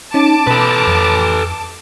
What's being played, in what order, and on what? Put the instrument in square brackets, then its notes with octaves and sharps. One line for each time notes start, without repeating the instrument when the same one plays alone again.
[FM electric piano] C#4 D#4 [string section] A5 D6
[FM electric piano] B2 B5 [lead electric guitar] A4 B4
[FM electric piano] F2